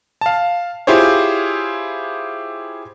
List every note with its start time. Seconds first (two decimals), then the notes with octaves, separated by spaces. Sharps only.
0.21 F5 A5
0.87 E4 F4 G4 G#4 C5 C#5